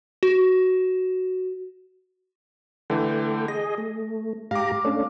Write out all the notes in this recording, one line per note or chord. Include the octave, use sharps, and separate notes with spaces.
F#4
D3 E3 A3 G5
G#4 D#5 A#6
A3
G#2 G4 F5 A#5 D6
A3 C#4 D4